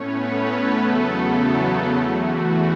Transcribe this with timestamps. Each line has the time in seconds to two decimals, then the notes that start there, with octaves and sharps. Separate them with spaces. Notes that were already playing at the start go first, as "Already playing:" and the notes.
Already playing: A2 A3 B3 C#4 B4 C#5
0.21 A3 A4
0.79 E2 C#3 F#3 B3
1.93 E2 E3 A3 F#4